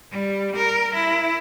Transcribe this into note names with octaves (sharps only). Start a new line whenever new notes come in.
G3
A#4
E4